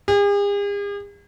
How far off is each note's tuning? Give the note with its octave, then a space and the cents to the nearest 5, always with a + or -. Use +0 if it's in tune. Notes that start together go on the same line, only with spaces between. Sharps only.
G#4 -45